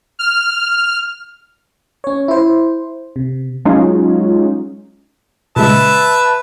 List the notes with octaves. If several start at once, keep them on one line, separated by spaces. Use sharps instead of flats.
F6
C#4 C#5
E4 C5
C3
F#3 G#3 C#4 D#4 F4
A#2 C#3 G#3 B4 E5 A5